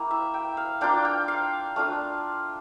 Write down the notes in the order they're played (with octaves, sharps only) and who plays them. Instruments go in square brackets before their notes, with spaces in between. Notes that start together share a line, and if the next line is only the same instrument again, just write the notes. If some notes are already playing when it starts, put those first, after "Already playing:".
Already playing: [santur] A#3 E4 G5
E5
G5
F5
A#3 D4 F4 G5
G5
F5
A3 D4 F4 F5